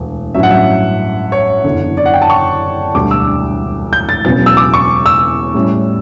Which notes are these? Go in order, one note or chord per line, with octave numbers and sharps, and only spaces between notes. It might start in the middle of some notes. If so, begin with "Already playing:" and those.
Already playing: E1 D2
A1 G2 F#3 C#4 E5
F#5
E5
C#5
F#1 E2 D3
D5
F#5
G5
A5
C#6
E1 D2 D3 G3 D6
E6
G6
A6
E1 E2 C#3 F#3 B3 A6
E6
D6
C#6
E6
A2 G3 C#4